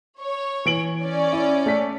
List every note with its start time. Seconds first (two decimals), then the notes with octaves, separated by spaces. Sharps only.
0.20 C#5
0.65 E3 D7 F#7
1.03 C#4 D5
1.33 E4
1.66 A3 B6